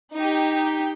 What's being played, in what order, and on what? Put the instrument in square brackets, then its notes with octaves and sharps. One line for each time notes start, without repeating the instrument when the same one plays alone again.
[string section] D#4 G4